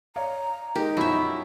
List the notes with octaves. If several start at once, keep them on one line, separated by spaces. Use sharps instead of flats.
C#5 D5 F5 A#5
G#3 D#4 G4 A#4
F#2 B2 F3 F#3 E4 E5